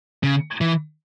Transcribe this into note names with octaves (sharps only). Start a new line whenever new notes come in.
C#3
E3